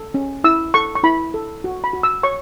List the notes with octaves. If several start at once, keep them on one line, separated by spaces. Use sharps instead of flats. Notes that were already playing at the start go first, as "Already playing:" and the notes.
Already playing: A4
C#4
E4 E6
A4 C#6
C#6
E4 B5
A4
F#4
B5
F#4
E6
C#5 C#6